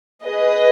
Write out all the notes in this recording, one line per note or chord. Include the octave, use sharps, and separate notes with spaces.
G#4 B4 D#5